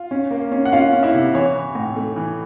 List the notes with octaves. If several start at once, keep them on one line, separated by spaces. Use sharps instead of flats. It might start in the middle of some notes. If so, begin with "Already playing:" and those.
Already playing: F4
C#4
A#3
C#4
F#5
C#4 F4 F5
C#4
E4 E5
C3
E3 C#5
E3
A2
A3
E3